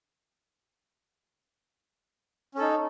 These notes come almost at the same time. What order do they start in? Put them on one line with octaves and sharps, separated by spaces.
C#4 A4 D#4